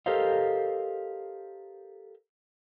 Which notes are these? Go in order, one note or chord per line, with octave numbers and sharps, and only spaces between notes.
G4 A4 A#4 C5 D#5 F5